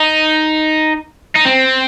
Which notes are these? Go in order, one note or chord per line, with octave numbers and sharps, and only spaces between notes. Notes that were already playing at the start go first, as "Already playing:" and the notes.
Already playing: D#4
D#4
C4